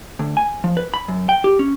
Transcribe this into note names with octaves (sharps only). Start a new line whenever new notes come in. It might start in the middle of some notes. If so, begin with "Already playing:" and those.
D2
G#5
F3
B4
B5
F#2
G5
G4
C#4